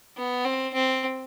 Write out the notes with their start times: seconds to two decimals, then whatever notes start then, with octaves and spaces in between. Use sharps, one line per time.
0.17 B3
0.45 C4
0.74 C4